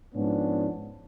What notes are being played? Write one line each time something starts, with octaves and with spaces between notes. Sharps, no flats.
G#2 F3 B3 C#4 D4